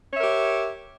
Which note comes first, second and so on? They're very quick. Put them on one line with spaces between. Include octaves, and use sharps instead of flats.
C#5 E5 A#4 G4